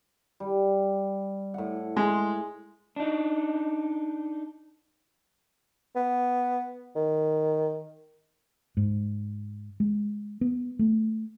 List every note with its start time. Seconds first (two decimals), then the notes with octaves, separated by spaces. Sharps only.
0.40 G3
1.54 A2 F#5
1.97 G#3 C6
2.96 D4 D#4
5.96 B3
6.96 D#3
8.77 G#2
9.80 G#3
10.41 B3
10.79 A3